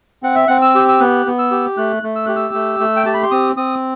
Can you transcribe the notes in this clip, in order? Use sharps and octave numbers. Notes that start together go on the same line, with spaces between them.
C4 F#5
E5
C4 F#5
E6
G4
E6
B3 F#6
B3
E6
G4
A3 F#6
A3
E6
G4 F#6
E6
A3
A3
G5
G4 A5
B5
C6
C4 D#6
C4 D#6